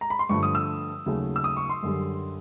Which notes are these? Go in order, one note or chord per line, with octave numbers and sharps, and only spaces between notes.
A#5
B5
C6
G2 D3 F3 A3 C#6
D#6
E6
D#2 C#3 F#3 A3
E6
D#6
C#6
C6
F#2 D3 G3